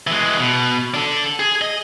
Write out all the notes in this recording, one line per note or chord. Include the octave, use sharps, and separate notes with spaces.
E3 G#3
B2
D4 A4
G#4
D#5